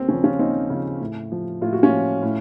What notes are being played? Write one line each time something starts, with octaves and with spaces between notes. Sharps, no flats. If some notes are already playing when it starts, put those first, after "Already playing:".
Already playing: D#2 C4
C#3 F3 C#4
C#4 F4
D#2 C4 D#4
C#3 F3
A2
F3
A2 F4
F#4
C#4 F4
F3
A2